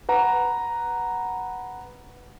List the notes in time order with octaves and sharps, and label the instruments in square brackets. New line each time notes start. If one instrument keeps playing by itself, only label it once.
[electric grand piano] B4 F#5 A#5